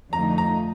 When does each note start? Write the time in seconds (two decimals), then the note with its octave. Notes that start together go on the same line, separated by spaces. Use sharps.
0.13 F2 D3 A3 D#4 A#5
0.38 A#5